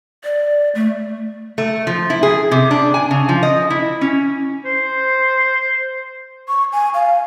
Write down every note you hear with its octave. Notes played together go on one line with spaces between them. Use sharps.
D5
A3
A3
F3
E4
G#4
C3
D4
G#5
C#3
F3
D#5
E4
C#4
C5
C#6
G#5
F5